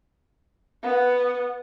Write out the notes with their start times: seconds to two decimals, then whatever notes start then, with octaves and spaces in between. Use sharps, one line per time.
0.83 B3 F#5